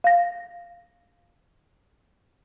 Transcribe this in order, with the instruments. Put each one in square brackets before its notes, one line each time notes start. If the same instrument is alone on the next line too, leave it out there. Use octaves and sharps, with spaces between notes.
[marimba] F5 A#6